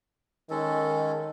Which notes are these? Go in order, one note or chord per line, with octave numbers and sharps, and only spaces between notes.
D#3 G#3 C#4 A4